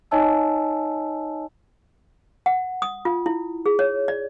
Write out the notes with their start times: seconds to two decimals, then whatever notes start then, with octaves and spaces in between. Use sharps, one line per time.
0.11 D#4 C#5 D#5 G#5 A5 E6
2.46 F#5
2.82 D#6
3.05 F4
3.26 E4
3.66 G#4
3.79 C#5
4.08 D5